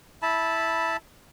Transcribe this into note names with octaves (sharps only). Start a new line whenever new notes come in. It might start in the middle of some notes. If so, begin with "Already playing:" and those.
E4 A5 B5